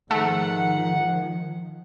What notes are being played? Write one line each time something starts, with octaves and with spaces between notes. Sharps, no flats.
G#2 D#3 F3 A3 F#5